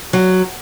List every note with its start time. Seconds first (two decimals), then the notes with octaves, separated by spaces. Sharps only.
0.13 F#3